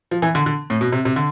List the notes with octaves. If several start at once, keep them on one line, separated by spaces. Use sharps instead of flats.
F3
E3
D3
D3
A2
B2
C3
C3
D3